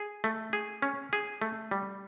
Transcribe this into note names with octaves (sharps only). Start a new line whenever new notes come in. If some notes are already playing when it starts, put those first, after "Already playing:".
Already playing: G#4
A3
G#4
C#4
G#4
A3
G3